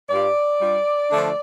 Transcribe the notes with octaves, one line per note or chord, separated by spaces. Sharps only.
G2 G3 F4 D5
G2 G3 F4
D3 F3 A3 D4